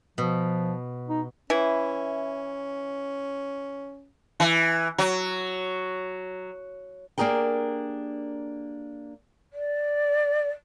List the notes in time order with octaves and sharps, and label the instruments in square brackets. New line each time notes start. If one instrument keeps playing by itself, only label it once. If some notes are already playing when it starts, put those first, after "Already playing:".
[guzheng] B2 [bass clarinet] F3
[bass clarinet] D#4
[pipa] E3 E4 [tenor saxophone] C#4
[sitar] E3
F#3
[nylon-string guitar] A#3 D4 G4 G#4 A#4 G5
[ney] D5